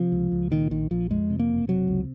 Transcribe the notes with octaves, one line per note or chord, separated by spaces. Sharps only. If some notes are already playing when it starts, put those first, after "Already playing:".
Already playing: C3 F3
C#2
C#2
A#2 D#3
A#1 D#3
A#1 F3
F2 G#3
C3
A#3
F#1
C3 F#3
C#2